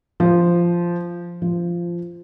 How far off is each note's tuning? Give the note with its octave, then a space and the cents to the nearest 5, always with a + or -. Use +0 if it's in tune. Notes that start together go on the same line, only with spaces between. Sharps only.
F3 -10
F3 -15